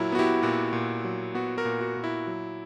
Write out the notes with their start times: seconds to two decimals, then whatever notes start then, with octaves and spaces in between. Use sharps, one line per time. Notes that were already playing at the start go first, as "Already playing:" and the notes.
Already playing: A#2 F#3 E4 A#4
0.12 B3 F#4
0.19 E4 G4
0.42 A#2 F#4
0.73 A#2
1.05 F#3
1.35 B3 F#4
1.57 F#4 A#4
1.65 A#2
1.81 F#4
1.97 A#2
2.04 E4
2.27 F#3